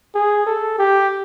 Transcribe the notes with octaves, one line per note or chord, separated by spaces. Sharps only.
G#4
A4
G4